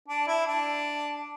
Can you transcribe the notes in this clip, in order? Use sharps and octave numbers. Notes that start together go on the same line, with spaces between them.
D4
E4
D4